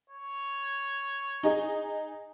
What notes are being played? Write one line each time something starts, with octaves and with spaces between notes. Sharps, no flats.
C#5
D#4 G#4 D#5